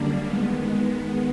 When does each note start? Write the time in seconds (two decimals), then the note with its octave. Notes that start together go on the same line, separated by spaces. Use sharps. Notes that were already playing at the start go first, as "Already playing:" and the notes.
Already playing: F#2 D3 G3 A#3 D4
0.24 D#3 G#3 B3